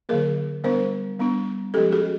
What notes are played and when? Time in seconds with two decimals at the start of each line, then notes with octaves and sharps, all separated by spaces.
0.09 D3 F#3 A#3 G#4 A#4
0.64 G3 B3 D4 A#4 C5
1.19 G3 B3 D4
1.74 F3 G#3 C#4 G4 A4
1.92 F#4 G#4